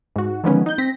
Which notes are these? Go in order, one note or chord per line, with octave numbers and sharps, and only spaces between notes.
G#2 F#4
D3 D#3 F3 G#3 B3 C#4
D#4 G6
C4 A#6 B6